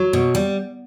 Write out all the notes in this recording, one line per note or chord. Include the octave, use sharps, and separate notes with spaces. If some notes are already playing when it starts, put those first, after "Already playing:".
Already playing: F#3
B2
G3